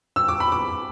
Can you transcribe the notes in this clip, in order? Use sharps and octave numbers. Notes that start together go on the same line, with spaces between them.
E6
D6
B5
D6